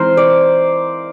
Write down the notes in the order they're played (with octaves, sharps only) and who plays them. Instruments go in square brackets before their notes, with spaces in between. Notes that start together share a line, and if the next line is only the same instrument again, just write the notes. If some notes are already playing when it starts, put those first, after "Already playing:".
Already playing: [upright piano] E3 G#3 C4 D#4 [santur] A#4 C5
[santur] D5